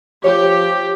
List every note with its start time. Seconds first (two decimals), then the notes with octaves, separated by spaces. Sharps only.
0.24 F3 G4 C#5